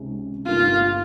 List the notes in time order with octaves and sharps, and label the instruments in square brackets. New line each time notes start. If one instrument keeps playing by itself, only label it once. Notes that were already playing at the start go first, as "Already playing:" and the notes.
Already playing: [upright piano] C#2 C3 D#3 G#3 C#4
[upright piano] G1 G2 G3 A#3 D#4 [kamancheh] F4